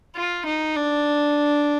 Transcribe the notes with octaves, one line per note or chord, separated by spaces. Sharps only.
F4
D#4
D4